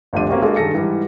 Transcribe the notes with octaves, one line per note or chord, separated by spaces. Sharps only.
G#1 D2 G2 F3 D4 D#7
A#3 C4 C#4 F#4 G4
G#3 A#3 D4 F#4 G#4 A4
G2 D#3 G#4 A4 A#6 C#7
G#2 E3 G3